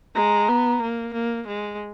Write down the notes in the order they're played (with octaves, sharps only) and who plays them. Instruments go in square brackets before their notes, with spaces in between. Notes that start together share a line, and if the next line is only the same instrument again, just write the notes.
[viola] G#3 [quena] A#5
[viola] B3
A#3
A#3
G#3